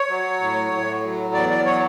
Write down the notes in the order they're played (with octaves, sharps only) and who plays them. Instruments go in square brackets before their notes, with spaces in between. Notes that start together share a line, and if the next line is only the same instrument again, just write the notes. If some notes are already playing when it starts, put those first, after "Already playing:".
Already playing: [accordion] C#5
F#3
A2
A2
F#3
E2 D5
D5
F#3 C#5